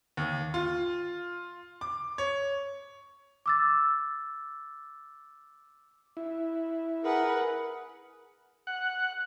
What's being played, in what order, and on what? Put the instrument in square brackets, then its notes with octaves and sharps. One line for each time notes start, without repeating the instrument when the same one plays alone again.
[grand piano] D#2
F4
D6
C#5
[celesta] D6 E6 A6
[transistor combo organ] E4
[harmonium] G#4 A#4 [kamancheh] B4 F#5
[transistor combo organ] F#5